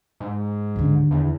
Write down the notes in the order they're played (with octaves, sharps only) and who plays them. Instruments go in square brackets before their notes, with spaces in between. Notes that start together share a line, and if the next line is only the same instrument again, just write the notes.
[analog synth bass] G#2
[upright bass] D#2 D3
[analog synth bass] E2